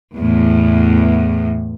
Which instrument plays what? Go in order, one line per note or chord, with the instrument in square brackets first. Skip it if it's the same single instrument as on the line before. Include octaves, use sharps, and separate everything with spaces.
[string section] E2 A2